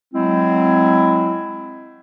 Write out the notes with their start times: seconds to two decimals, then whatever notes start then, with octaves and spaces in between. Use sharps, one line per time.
0.14 F#3 G#3 C4 E4